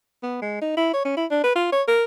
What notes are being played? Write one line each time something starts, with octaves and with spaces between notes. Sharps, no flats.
B3
G#3
D#4
E4
C#5
C#4
E4
D4
B4
F4
C#5
A#4